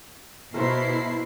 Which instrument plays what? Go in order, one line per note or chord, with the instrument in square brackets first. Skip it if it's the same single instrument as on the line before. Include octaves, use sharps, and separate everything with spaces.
[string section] B2 E4 C7 [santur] A#4 C5 A5
[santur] A#4